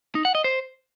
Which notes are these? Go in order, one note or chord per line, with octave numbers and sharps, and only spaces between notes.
D#4
F#5
D#5
C5